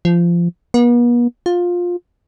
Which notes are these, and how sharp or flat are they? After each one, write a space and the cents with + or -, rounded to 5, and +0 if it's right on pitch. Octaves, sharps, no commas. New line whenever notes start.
F3 -20
B3 -45
F4 +15